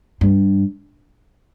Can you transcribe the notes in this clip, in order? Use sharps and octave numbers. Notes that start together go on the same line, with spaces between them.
G2